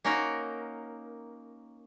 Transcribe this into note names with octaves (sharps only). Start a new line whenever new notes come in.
A#3 C#4 D#4 F#4 A#4